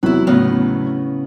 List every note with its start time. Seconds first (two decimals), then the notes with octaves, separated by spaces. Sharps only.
0.03 E2 C3 F#3 E4 B4
0.27 A2 C#3 B3